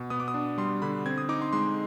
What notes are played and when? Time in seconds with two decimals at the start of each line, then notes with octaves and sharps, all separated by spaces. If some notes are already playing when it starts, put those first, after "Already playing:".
Already playing: B2
0.10 B3 D#6
0.20 D6
0.28 D#6
0.34 D4
0.58 G3 C6
0.82 D3 B5
1.06 C4 G#6
1.18 D#6
1.29 D#4 D6
1.42 C6
1.53 G#3 C6